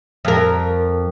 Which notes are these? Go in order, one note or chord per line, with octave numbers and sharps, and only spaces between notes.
F2 A#4